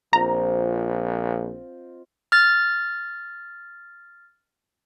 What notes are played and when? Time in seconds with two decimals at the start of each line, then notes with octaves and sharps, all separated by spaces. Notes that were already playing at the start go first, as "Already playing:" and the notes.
0.13 A#1 C4 F4 D#5 A#5
2.32 F6 A6